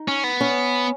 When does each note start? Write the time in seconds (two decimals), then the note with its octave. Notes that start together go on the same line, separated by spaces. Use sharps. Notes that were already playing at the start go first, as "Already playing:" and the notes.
Already playing: D#4
0.08 C#4
0.24 B3
0.41 C#4